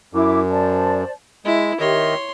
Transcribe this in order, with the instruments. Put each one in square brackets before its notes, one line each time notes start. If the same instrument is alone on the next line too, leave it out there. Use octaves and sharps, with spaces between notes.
[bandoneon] F#2 [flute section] E4 D6
[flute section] C5 D5 A5
[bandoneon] G#3 [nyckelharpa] E4 [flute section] E5
[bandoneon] D#3 D#5 [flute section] G4 E5 [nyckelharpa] C#5 C6